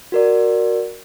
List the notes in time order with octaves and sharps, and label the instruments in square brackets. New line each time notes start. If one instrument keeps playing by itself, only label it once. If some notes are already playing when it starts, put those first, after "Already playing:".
[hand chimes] F#4 A#4 D5